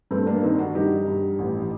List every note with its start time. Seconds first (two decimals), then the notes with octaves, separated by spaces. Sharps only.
0.11 G2 A3 C4
0.27 A#3 D4
0.43 D#3 C4 D#4
0.58 D4 F#4
0.75 G2 D#4 G4
1.08 G2
1.39 A1